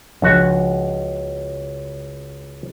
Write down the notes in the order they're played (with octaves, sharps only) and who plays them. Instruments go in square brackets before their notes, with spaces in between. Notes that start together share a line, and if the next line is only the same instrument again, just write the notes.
[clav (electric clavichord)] C#2 F#4 [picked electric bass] F3 D4